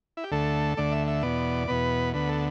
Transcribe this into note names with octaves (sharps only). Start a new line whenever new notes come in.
E4
G4
D2 D3 A3 A4
D2 D3 A3 D5
E5
E5
E2 B2 B3 D5
E2 B2 B3 B4
D2 D3 B3 B4
A4